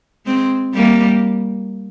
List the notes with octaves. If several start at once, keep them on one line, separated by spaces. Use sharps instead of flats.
G#3 C4
G3 A#3